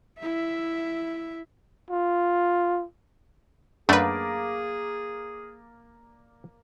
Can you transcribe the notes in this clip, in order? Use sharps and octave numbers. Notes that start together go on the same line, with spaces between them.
E4 E5
F4
F#2 A3 A#3 D4 G#4 A#4 B4 D5